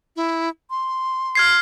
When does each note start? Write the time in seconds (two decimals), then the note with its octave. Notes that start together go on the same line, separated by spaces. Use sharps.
0.16 E4
0.70 C6
1.35 F6 G#6 C7